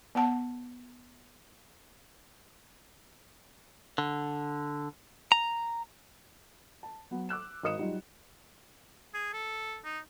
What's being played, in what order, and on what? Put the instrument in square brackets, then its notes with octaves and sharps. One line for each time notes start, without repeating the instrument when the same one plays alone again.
[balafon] B3 F#5 A5
[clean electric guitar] D3
A#5
[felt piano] A5
F#3 B3
D6 E6 F#6 E7
G#1 A#4 D#5 D#6 C#7 E7
F#3 G3 D#4 F4 D#5
[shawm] G#4
A4
D#4